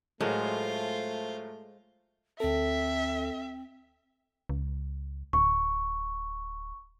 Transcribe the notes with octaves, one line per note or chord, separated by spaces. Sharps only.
A2 F#3 G#3 A3 F4 A#4 C5
D2 C4 A4 E5
C#2
D1 C#6